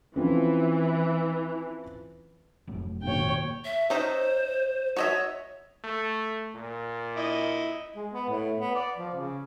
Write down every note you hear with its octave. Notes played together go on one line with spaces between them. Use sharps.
E3 F3 C4 C#4
F1 F#2 A2
D#1 B1 C#5 G5
E5
C#4 D#4 C5 E5
F#4 C#5 D#5 E5
A3
A#2
E4 D#5
G#3
B3
A2
B3
D5
F3
C#3